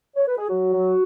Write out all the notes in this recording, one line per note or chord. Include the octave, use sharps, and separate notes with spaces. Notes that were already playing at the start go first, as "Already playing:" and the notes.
C#5
B4
G#4
F#3 F#4
F#3